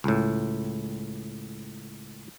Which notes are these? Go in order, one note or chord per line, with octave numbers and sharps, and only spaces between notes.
C#2 A2